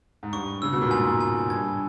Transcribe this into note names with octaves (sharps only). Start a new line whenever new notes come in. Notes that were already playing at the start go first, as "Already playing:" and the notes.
G#2
G2 C#6
C#3 E6
B2
A#2
G#2 G#5
G#5
G2 G#6